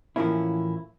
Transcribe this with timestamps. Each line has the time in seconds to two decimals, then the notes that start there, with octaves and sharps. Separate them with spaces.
0.16 A2 E3 F3 A#3 C#4 E4